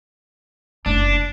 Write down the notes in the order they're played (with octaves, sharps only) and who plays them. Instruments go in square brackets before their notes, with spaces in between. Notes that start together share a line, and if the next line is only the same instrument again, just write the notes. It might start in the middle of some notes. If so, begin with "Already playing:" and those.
[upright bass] F#1 [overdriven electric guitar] D4